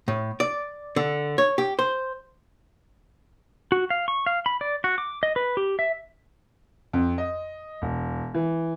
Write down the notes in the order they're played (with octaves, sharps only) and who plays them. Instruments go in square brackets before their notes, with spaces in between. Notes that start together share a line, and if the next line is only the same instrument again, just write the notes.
[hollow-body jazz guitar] A2
D5
D3
C#5
G4
C5
[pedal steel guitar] F#4
F5
C#6
F5
B5
D5
F#4
D6
D#5
B4
G4
E5
[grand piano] F2
D#5
E1
E3